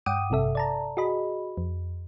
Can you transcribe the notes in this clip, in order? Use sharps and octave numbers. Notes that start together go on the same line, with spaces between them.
G2 F#5 G5 D6 D#6 D#7
A1 G2 C3 A4 E5
D5 A5 A#5
F#4 G#4 D#5 B5
F2